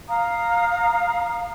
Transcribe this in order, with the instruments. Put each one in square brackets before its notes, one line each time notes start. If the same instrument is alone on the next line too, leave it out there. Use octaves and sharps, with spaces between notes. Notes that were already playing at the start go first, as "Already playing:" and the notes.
[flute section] F5 A#5 D#6